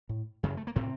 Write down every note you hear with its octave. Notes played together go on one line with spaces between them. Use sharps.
A2
F#2 C#3
A3
A#3
A2 C3 C4